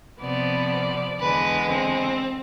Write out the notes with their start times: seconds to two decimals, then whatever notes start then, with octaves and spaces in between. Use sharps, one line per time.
0.21 C3 F3 B3 D5
1.20 E2 D3 G#3 B4
1.70 C4